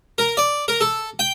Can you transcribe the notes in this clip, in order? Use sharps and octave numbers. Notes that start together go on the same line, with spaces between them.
A#4
D5
A#4
A4
G5